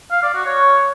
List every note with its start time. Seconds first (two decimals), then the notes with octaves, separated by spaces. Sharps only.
0.11 F5
0.23 D5
0.34 F#4
0.46 C#5